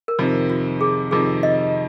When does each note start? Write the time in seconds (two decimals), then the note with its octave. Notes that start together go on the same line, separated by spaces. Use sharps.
0.08 A#4
0.19 F2 C3 D#3 C5
0.50 F4
0.81 G#4
1.11 F2 C3 D#3 G#4
1.43 D#5